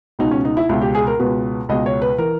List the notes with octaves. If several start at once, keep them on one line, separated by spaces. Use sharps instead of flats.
C#2 B2 D#4
C#4
D#4
E4
C#2 B2 E4
G4
G#4
A#4
C#2 B2 B4
C#2 B2 D#5
C#5
B4
E3 A#4